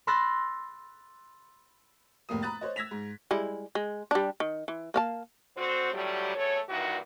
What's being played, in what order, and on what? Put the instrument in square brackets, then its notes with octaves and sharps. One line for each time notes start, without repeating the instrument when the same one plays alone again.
[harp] B5 C6 E6 F#6 A6 A#6
[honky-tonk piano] F1 A2 A#3 D#6
A#5 B5 D#6 F#6 A6
C5 C#5 D#5
E6 G#6 A#6 B6 F7
G#2
[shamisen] G3 G#3 E4
G#3
G3 D4
D#3
E3
A#3 F5 A5
[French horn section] D3 C4 F#4 C5
A2 D3 F#3 G3
E2 A3 A4 C#5
G2 A#2 D#3 E3 F#4